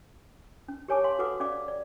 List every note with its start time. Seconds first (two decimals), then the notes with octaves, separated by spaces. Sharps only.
0.68 C#4
0.88 G4 A#4 C#5 G#5 A5 D6
1.04 F5 G#5 C6
1.19 F#4 A4 B4 F#5 D6
1.40 C#4 D5 F5 D6
1.68 D5